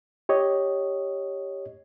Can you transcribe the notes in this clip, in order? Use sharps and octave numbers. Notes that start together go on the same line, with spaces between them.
G4 C#5 D#5